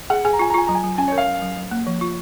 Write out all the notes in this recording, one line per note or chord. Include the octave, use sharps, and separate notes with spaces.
G#4 F#5
G#4 G#5
A#5
F4 G#5
A#5
F4 G#5
F#3 A#5
G#5
F#3
C#4 G#5
A#4 C#5
F5
F#3
F#3
F#3
A#3
F3
F4